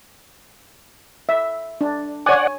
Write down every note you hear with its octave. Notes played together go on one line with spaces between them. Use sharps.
E5
D4
C#5 D5 F#5 G#5